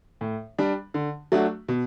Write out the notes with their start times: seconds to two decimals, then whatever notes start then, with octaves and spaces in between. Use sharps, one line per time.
0.21 A2
0.58 G3 D4
0.94 D3
1.32 F#3 A3 D4 F#4
1.68 B2